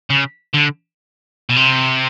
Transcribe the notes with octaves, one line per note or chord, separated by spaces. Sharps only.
C#3
D3
B2
C3